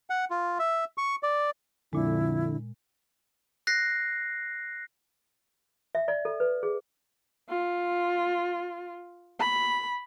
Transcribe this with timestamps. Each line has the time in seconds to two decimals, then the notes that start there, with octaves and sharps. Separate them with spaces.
0.10 F#5
0.31 F4
0.59 E5
0.98 C#6
1.23 D5
1.93 F2 A#2 D3 G#3 E4
3.67 F#6 A#6 C7
5.95 E5
6.08 D5
6.25 A4
6.40 B4
6.63 G#4
7.50 F4
9.39 B5